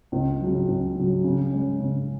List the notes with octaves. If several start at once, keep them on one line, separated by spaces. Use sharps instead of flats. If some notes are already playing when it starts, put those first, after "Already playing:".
C#2
C#3 F#3
C#2
C#3 F#3
C#3
G#3 C#4
C#3